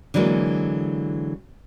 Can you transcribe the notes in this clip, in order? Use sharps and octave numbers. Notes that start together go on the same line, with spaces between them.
D3 E3 F#3 G#3 A#3